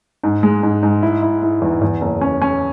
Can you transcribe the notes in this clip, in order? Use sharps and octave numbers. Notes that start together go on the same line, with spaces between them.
G#2
G#3
G#2
G#2
E4
E4
E4
E2
E2
F#1
C#4
C#4